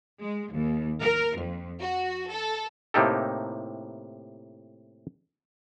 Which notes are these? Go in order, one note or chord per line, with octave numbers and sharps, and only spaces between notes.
G#3
D#2
A#4
F2
F#4
A4
A2 C3 A#3 D#4 G4 A4